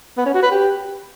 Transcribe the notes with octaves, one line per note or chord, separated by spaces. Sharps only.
B3
C#4
F#4
B4
G4